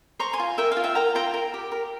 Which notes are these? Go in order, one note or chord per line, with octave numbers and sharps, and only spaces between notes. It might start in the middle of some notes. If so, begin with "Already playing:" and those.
C5 A#5 C#6
G#5 C6
F4
A#4 E5 G5
F5
F4
E5 G5
A#4 G5 A#5
F4 G5 A#5
A#4
G4
A#4